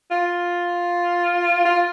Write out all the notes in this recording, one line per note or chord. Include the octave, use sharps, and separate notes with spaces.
F4
F4